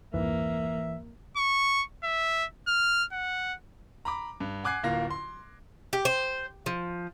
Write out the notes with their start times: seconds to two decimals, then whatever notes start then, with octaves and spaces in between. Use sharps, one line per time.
0.14 C2 F2 G#2 E3 A#3 E5
1.37 C#6
2.04 E5
2.67 F6
3.12 F#5
4.05 A#5 B5 D6
4.40 G2
4.64 F#5 G#5 D6 F#6 G#6 C7
4.84 D1 A#3 F4 A#6
5.10 C6
5.93 G4
6.05 C5
6.66 F3